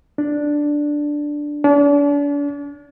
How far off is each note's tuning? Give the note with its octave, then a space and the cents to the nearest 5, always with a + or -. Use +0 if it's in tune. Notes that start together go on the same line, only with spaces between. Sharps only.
D4 +0
D4 -40